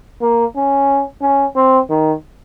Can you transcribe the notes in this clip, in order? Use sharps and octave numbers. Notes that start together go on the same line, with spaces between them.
A#3
C#4
C#4
C4
D#3